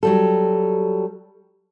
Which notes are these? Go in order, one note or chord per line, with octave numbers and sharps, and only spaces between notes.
F#3 G3 A4